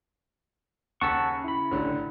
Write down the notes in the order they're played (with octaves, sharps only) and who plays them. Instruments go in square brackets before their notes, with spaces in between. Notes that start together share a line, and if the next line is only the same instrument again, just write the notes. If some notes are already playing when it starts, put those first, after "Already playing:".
[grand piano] D#2 [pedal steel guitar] C#3 C#4 C#6 [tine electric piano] F#5 A5 E6
[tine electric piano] E4 B5
[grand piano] A1 D3